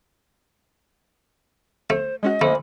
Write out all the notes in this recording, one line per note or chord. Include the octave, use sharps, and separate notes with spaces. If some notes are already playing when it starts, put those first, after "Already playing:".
A3 C5
G#3 C#4 F#4 D#5
A#2 A3 C5 B5